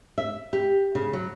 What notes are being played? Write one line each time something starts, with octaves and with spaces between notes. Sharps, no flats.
E5
G4
C#3
F#3